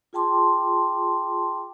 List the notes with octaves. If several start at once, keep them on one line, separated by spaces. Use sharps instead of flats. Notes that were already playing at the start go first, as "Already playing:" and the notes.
F4 G#4 G5 A5 C6 D6